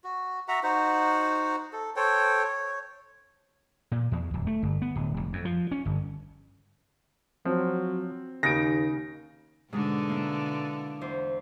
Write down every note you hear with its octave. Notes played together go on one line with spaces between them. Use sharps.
F#4
F#4 E5 F#5 A#5
D#4 F#4 C5 F#5
A4
A4 C5 C#5 G5
C#5
A#2
E2
D1
A3
G1
B3
D1
F1
F2
F3
C#4
G1
F3 F#3 C4
D#2 C#3 D#4 G#5 A#6 D7
G#2 B2 D3 G#3
A#3 E4
E2 C5